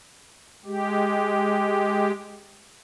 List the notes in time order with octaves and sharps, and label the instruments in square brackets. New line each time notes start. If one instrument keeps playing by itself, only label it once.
[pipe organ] G#3 G4